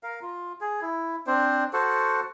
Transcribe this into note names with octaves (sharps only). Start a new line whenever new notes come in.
A#4 F5
F4
G#4
E4
C4 D4 C5
F#4 A4 C5 F#5